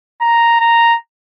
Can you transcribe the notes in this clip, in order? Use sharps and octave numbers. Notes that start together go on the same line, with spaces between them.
A#5
A#5